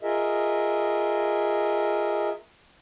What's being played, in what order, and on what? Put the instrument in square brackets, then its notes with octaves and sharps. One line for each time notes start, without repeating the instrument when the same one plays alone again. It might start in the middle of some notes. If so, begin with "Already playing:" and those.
[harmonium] F4 G#4 A#4 D#5 E5